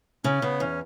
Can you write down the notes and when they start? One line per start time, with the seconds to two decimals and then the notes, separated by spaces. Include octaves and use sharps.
0.24 C#3 C#4
0.42 C#3 B3
0.60 E2 C#4